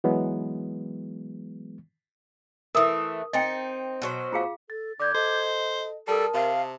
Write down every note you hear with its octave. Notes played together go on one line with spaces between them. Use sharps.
E3 F#3 G#3 B3
E3 A3 A#4 D#6
C4 D#4 D#5 G5
B2 F#3 C5
F4 G#4 F5
A4 A6
D3 D5 D6 G6 G#6
A4 C5 D#5
G3 A4 A#4 A5 D#6
C3 F5